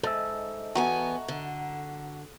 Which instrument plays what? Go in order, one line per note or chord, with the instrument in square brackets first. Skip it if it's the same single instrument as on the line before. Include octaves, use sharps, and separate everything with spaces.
[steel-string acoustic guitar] G#2 [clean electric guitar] A4 D#5 E5
[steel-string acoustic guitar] E2 B3 G#5 [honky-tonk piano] F#4 A#5 C#6
[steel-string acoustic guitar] D3